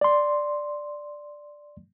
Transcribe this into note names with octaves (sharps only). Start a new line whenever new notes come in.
D5 C6